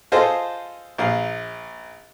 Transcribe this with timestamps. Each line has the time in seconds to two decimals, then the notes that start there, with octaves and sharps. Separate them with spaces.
0.12 F4 G#4 A4 C5 D#5
0.98 A#1 F5